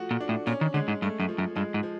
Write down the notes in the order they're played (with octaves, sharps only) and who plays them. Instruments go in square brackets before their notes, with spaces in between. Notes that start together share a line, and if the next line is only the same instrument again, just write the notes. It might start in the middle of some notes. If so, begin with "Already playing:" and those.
Already playing: [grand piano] F3 A3 F#4
[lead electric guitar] A#2
[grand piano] D4
[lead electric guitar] A2
[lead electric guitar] A#2 [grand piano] C#4
[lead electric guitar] D#3
[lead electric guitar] D3 [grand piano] G#3
[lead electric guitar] G#2
[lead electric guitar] G2 [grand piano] A3
[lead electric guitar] F#2
[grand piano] F3
[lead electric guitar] F#2
[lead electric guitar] G2 [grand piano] G#3
[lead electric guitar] G#2
[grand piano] F3